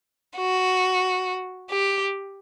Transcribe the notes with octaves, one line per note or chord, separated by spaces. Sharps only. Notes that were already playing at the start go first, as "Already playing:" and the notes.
F#4
G4